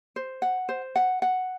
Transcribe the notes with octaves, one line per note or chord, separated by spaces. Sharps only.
C5
F#5
C5
F#5
F#5